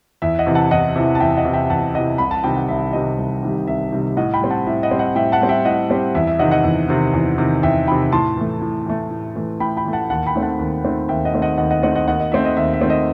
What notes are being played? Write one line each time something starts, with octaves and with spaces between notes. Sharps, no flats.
E2 E5
D#5 F#5
C3 E3
F#5 A5
E2 D#5 F#5
C3 E3 E5
A5
E2 E5 G5
D#5 F#5
C3 E3
E5 G5
E2 F#5 A5
C3 E3 D#5 F#5
C2 B5
A5
C3 D#3 G3 G5
F#5
C2 E5
C3 D#3 G3 D#5
C2
C3 D#3 G3
C2 E5
C3 D#3 G3
A2 D#5 F#5
G5 B5
G3 C4
F#5 A5
A2 E5
D#5 F#5
G3 C4
D#5 F#5
A2 E5 G5
F#5 A5
G3 C4
E5 G5
A2 D#5 F#5
G3 C4
E2 E5
E5
C3 D#3 D#5 F#5
D#5 F#5
E2
C3 D#3
E2
C3 D#3
E2 E5 G5
C3 D#3 G5 B5
A2 A5 C6
E3 A3
A2
E3 A3
A2
E3 A3
A2 G5 B5
G5 B5
E3 A3
F#5 A5
D#2 F#5 A5
G5 B5
D#3 A3 C4
F#5 A5
D#2
D#3 A3 C4
D#2 E5 G5
D#5 F#5
D#3 A3 C4
D#5 F#5
D#2 D#5 F#5
D#5 F#5
D#3 A3 C4 D#5 F#5
D#5 F#5
D#2 D#5 F#5
D#5
D#3 A3 C4 E5
D#5
D#2 E5
E5
D#3 A3 C4
D#5